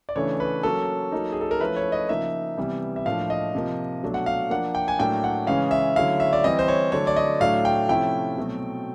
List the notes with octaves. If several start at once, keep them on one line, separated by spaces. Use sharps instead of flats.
D5
C#3 E3 A3 D4 C#5
B4
F#3 A#3 C#4 A4
F#3 A#3 D#4
G#4
A4
A#4
F3 A3 C#4 E4 B4
C#5
D#5
C#3 F3 A#3 D#4 E5
C3 E3 G3 B3
E5
A2 F3 A#3 D4 F5
D#5
C3 F3 A#3
B2 F#3 A3 D4
F#5
F5
F3 A#3 D4 F#5
G5
G#5
A2 F#3 A#3 D4 G5
F#5
C#3 E3 G#3 C#4 F5
E5
D3 F#3 A3 C#4 E4 F5
E5
D5
E3 G3 C4 E4 D#5
C5
C#5
D3 F#3 A3 D4 C#5
D5
D#5
A2 F#3 A3 D4 F5
G5
C3 F3 A3 C#4 E4 G5
B2 F#3 A3 C4